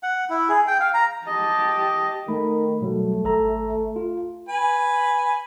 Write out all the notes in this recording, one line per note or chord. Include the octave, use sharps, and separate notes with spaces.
F#5
E4
G#4
G5
F5
A#5
G4 D#5 A5
D#3 A3 B5
B2 F#3 G3 A3
G#1 A4 A#5
F4
B4 G#5